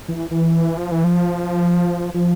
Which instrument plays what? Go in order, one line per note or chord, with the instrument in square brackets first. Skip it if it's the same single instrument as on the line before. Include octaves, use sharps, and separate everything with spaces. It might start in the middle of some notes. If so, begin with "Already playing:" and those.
[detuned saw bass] E3
E3
F3
E3
F3
F3